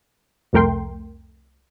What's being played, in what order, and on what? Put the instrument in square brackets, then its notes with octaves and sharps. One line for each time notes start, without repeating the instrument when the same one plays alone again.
[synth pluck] C2 F2 A3 A#4 G5 C6